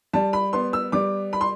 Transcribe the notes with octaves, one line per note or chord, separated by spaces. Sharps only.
G3 A5
B5
B3 C6
E6
G3 D6
B5
C6